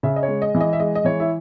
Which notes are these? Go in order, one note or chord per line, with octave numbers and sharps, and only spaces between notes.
C#3 E5
D#5
C#5
G#3
D#5
E3
D#5
E5
G#3 D#5
D#5
E3 C#5
E4